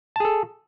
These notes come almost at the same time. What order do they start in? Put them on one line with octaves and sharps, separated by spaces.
A5 G#4 A4